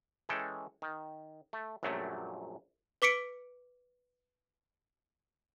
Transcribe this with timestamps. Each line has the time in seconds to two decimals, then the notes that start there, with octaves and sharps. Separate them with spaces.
0.29 E3 G#3 C#4 A4 G5
0.82 D#3
1.53 A3
1.83 A#1 F#2 A#2 F#3 G3 A3
3.02 B4 D6 B6 C#7 D7